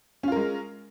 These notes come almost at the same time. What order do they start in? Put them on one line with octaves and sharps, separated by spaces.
C#4 F4 A#4 G#3